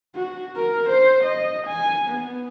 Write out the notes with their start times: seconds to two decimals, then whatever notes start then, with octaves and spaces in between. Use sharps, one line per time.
0.15 F#4
0.56 A#4
0.90 C5
1.24 D#5
1.67 G#5
2.08 B3